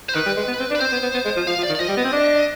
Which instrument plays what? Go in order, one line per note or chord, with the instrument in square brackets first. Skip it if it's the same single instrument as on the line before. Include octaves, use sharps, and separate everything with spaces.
[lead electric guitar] C5
[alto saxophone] D#3 [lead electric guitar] B4
[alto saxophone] G3
G#3
B3
C4
D4
[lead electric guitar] B4
[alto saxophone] C4 [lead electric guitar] C5
[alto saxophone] B3
B3
B3
G#3
F3
[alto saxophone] F3 [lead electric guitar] F5
[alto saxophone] F3
[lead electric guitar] D5
[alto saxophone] D#3
[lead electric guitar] D5
[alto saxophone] F3 [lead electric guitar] D#5
[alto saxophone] G3
B3
C4
D4